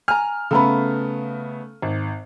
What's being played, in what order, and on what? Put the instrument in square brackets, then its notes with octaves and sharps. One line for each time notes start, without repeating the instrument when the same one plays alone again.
[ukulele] G#5 A#5 [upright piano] F6
[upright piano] C#3 A3 B3 [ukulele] A4 A#5 B5
[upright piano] G#1